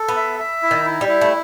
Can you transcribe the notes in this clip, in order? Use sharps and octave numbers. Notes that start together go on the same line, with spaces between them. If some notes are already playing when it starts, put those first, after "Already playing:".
Already playing: A4
B3
E5
E5
E4
D#3
E4
G3
E4
A3